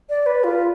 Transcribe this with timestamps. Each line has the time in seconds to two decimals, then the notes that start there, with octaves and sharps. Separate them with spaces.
0.10 D5
0.26 B4
0.44 F4